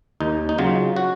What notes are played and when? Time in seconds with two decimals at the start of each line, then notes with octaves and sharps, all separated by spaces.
0.20 D#2 D#4
0.49 D#4
0.58 C#3 F#3 F4
0.96 F#4